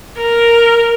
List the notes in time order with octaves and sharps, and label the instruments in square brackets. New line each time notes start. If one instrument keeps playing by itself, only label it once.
[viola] A#4